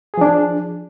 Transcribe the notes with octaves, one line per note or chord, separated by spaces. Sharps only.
F3 D4 G#4